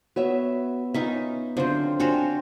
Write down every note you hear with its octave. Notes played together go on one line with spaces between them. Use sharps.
B3 F#4 B4 C#5 E5
C#4 D#4 F4 E5
D3 F#3 C4 F4 C5
C4 D4 F4 F#4 C5 C#5 G#5 C6